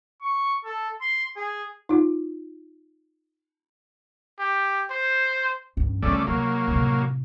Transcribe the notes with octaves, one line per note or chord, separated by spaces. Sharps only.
C#6
A4
C6
G#4
D#4 F4
G4
C5
A1 G2
C#3 G3 A3 B3 D5
C3 F#3 A#3
A2 C3